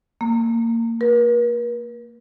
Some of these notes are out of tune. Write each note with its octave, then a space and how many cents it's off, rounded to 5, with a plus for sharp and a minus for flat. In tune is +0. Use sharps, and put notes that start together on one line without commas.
A#3 -25
A#4 +45